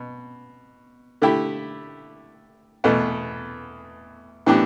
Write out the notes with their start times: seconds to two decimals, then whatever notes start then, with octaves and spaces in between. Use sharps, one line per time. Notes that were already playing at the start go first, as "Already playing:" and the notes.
Already playing: B2
1.22 D3 A3 E4 G4
2.84 E2 B2 A3
4.46 A2 E3 B3 D4 G4